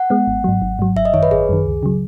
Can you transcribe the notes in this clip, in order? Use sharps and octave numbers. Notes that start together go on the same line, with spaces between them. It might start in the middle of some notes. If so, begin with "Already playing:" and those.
Already playing: F#5
G#3 B3
G#1
G#2 F#3
G#1
G#2 F#3
G#1 E5
D#5
F#2 D#3 C#5
B4
G#1 G#4
F#2 D#3
C#2
C#3 F#3